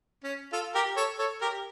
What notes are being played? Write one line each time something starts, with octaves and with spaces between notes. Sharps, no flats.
C#4
F4 A4
G4 A#4
A4 C#5
A4 C#5
G4 A#4